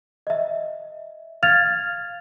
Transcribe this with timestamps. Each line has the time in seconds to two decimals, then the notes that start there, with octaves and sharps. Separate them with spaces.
0.27 D#5 E5
1.43 F5 F6 G#6 A6 F7